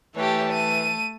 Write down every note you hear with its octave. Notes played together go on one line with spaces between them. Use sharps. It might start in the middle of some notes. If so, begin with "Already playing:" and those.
E3 A3 G4 C#5 A5
D#7